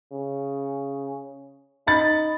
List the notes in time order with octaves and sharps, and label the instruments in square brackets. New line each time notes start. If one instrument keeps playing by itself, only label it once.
[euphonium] C#3
[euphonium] D#4 [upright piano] B5 A6